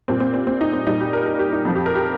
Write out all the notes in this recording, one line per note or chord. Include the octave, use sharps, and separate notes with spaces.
A#2 G3 C4
C4
C4
C4
D#4
C4
A#2 G3 D#4
G4
A#4
A#4
G4
D#4
F2 F3
G4
A#4
G4